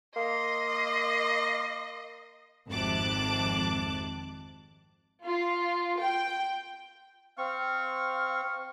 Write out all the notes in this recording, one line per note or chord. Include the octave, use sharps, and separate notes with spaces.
A#3 D#5 C6
G#1 F2 C3 A5 D6 F#6
F4
G5
C4 F5 C#6